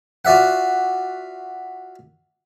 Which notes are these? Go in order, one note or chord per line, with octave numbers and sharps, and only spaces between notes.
F4 F#4 D5 E5 F#5